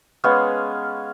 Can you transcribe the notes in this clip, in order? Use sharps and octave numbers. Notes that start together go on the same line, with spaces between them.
G#3 B3 C#4 F5